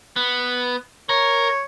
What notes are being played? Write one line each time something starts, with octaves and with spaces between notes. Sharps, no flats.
B3
A#4 C#5